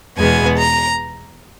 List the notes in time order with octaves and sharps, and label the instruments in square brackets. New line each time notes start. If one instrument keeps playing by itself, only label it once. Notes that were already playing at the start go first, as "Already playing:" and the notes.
[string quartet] E2 B2 G#3 B3 G#5
A#5